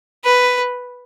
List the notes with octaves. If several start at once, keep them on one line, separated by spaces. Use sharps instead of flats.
B4